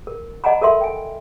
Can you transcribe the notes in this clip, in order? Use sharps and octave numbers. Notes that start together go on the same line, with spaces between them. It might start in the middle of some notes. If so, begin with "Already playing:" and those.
A#4
D#5 F#5 G#5 A#5 B5
A4 A#4 E5 C6
G5 G#5